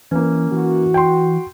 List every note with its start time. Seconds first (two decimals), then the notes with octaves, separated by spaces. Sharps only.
0.11 E3 A#3 C#4
0.52 E3 F#4
0.94 G5 C6